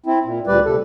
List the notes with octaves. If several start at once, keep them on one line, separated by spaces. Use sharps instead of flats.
C4 E4
A#2
D2 A#2 G3 B4 D5
C3 A4